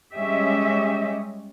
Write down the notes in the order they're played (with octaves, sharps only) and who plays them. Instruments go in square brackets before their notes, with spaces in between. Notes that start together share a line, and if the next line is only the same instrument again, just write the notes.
[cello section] G3 G#3 C#4 G4 D#5 E5